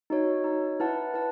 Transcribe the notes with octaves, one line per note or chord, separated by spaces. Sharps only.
D#4 F#4 C#5
D#4 F#4 C#5
E4 B4 F#5 A5
E4 B4 F#5 A5